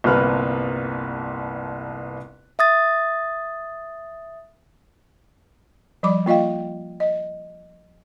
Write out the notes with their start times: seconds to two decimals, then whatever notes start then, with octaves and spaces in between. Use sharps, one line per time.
0.04 G1 C2 A#3 C4 B4 F6
2.59 E5 D#6 A6
6.03 F3 G3 D5 B5 D6
6.26 A#3 F4 D#5 F5 G5
7.00 D#5